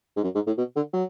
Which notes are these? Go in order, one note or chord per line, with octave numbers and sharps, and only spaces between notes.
G#2
F#2
G#2
A2
B2
D3
F#3